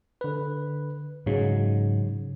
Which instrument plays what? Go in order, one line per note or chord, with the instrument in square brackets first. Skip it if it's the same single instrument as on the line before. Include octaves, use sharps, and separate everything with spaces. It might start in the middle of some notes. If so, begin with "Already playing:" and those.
[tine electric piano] D3 B4
[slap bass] G#2 [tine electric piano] C#3 F#3